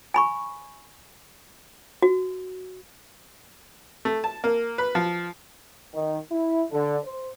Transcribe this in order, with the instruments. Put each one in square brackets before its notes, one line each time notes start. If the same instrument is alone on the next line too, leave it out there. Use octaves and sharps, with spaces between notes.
[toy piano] G#5 B5 C#6
F#4
[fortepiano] A3
A5
A#3
B4
F3
[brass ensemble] D#3
E4
D3
C5